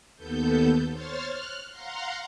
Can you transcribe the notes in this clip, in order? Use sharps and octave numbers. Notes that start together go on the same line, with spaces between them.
D#2 B3 A4 G6
C5 C#5 C6 F6 A6
F6 F#6
F5 F#5 A#5 C6